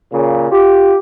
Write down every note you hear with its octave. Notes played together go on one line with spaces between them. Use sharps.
A#2 C#3
F4 G4